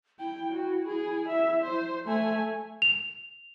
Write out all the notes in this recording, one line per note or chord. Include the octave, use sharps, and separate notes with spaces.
E4 G5
F#4
G#4
E5
C5
A3 G#5
F7